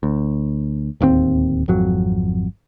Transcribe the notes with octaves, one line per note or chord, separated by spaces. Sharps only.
D2
D1 D#2 C#3 C4
G#1 F2 F#3